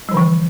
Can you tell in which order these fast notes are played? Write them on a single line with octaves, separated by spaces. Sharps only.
G3 F3 D3 E3